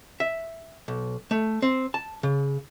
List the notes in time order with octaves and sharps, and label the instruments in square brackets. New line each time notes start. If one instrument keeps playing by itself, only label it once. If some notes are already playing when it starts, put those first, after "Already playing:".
[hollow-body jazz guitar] E5
B1
A3
C4
A5
C#3